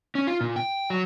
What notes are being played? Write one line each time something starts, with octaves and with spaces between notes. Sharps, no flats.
C#4
F4
A#2
G5
F#3